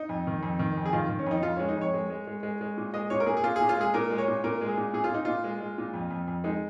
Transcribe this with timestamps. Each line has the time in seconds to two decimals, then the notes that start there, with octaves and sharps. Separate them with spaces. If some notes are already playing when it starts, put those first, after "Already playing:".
Already playing: D#4
0.09 F2
0.27 D#3
0.43 F2
0.59 D#3
0.77 F2
0.85 G#4
0.93 D#3 F4
1.09 D#3
1.19 C#4
1.26 F2 D#4
1.37 D#4
1.43 F2 F4
1.56 G#3 C#4
1.69 D#4
1.77 F2 C#5
1.94 G#3
2.10 G#3
2.27 G#3
2.43 G#3
2.61 G#3
2.77 A#2
2.94 G#3 D#5
3.10 A#2 C#5
3.20 A#4
3.26 A#2 G#4
3.37 G#4
3.44 A#2 F4
3.56 G#4
3.61 A#2
3.69 F4
3.76 G#3 G#4
3.94 A#2 A#4
4.10 G#3
4.18 C#5
4.28 A#2
4.44 A#2 A#4
4.61 G#3
4.68 G#4
4.77 A#2
4.93 A#2 G#4
5.04 F4
5.10 A#2 D#4
5.25 A#2 F4
5.44 G#3
5.61 G#3
5.78 A#2
5.94 F2
6.10 F2
6.28 F2
6.44 G#3 D#4